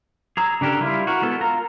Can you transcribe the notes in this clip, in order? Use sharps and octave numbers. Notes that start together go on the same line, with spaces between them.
G#4 A#5 E6
C#3 D4 G4 A4 A#4
G3 E4 F4
F#4 A#4
G#3 B3 A4
F4 A#4 A#5